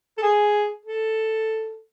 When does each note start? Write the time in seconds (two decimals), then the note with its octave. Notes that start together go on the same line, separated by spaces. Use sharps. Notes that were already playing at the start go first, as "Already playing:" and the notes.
0.18 A4
0.22 G#4
0.85 A4